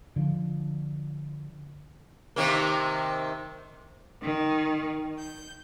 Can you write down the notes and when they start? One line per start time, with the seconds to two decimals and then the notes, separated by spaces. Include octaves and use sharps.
0.16 D3 F3
2.36 C3 D#3 A#3
4.22 D#3
5.19 G6